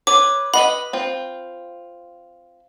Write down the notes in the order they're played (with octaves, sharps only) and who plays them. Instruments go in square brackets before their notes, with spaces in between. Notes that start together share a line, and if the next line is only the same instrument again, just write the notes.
[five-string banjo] B4 C#5 [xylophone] D6
[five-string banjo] B4 D#5 F#5 [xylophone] B5
[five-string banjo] C4 F4